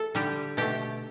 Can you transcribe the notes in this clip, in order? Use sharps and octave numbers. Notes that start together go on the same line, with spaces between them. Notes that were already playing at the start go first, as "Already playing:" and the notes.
Already playing: A4
D3 G3 G4
B2 A3 G4